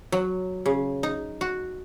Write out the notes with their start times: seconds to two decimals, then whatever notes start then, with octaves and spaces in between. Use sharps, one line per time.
0.12 F#3
0.66 C#3
1.03 D#4
1.41 F#4